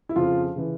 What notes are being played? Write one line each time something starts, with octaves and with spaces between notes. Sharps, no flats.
E4
F2 C#3 F3 F4
C#3 E3